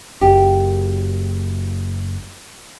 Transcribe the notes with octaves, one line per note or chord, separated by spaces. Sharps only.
F#1 G4